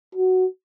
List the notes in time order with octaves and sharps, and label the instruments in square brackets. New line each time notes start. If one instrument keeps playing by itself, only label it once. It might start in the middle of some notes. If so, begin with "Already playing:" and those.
[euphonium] F#4